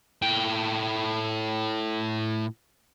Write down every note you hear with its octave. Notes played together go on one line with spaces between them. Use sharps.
A2 G5